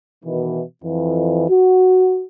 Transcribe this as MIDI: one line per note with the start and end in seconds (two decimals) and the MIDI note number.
0.25 0.62 47
0.25 0.62 51
0.25 0.62 52
0.84 1.46 41
0.84 1.46 52
1.50 2.23 66